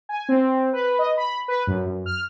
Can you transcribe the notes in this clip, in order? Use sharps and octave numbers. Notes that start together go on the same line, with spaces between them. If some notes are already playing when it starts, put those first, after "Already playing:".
G#5
C4
B4
D#5
B5
B4
F#2
F#2
F6